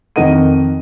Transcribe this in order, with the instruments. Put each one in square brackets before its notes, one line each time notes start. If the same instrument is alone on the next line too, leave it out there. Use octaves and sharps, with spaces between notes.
[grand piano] F2 D#3 A#4 D#5 F#5 D#7